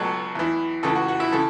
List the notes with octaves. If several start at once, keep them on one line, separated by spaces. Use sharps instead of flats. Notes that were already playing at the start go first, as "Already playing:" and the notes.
Already playing: C#2 B2 F#3 A4
E2 E3
C#2 C#3 E3 A4
F#4
F#4
E4
C#3 E3 A4